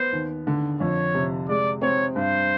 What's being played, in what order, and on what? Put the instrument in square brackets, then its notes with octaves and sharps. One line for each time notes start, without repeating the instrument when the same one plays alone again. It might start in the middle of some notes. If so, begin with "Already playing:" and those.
Already playing: [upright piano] B3 [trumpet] C5
[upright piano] D#2
D3
[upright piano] F2 [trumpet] C#5
[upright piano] C3
[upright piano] G#3 [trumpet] D5
[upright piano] C4 [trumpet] C#5
[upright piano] G2 [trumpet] C5